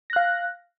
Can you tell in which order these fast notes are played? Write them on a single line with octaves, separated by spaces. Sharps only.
A#6 F#6 F5